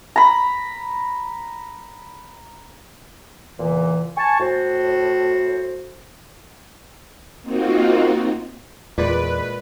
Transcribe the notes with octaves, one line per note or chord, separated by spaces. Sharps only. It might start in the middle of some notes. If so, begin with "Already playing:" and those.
A#5 B5
E2 A#2 C#3 E3
G#5 A5 C#6
A2 F#4 C5
A#3 C4 D#4 F4 F#4
E2 A#2 G#3 B4 D5